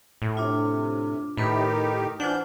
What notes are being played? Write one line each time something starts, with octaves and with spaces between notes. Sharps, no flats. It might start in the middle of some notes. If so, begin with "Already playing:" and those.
A2
C3 D4 F4 C#5
A2 D#3 D#4 G4 A4 B4 B5
E3 D4 F4 C5 F#5 G6